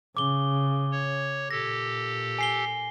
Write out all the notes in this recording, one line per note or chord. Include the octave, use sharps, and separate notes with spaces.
C#3 D6 G7
C#5
A#2 G4 A4 A#6
G#5 C7 G7